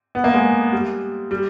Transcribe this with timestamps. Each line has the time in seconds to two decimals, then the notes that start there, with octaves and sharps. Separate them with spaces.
0.15 B3
0.24 A#3
0.34 G#3
0.72 G3
1.31 G3